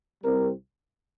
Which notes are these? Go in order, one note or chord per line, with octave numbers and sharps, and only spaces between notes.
C2 C3 G3 C4 A#4